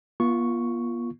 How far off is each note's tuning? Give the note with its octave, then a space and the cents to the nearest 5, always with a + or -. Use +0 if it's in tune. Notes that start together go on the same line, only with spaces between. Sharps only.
B3 -45 F4 -20 C#6 +0